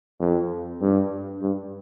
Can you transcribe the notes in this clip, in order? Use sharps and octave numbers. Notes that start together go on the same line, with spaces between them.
F2
G2
G2